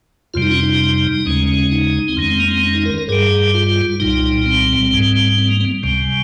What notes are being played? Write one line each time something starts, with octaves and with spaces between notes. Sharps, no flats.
F2 C3 G3 F4
D#4
C#4
D#4
D#2 C#3 G#3 C#4
D#4
C4
F2 D#3 G#3 C#4
C4
A#3
C4
C#4
D#4
A#4
A#4
G2 G3 G#4
F4
C2 A#2 G3 D#4
C4
G#2 G3
C4
A#3
C4
C#2 C3 G3